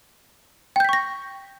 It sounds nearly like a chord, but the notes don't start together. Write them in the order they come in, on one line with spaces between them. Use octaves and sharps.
G5 G6 B6 C#6 A#6